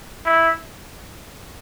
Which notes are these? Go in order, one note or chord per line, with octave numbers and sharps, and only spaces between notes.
E4